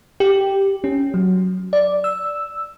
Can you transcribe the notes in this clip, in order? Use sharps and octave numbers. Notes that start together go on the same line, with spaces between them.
G4
C#4
F#3
D5
E6